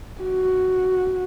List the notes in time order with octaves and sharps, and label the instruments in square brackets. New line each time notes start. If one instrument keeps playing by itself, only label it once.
[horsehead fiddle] F#4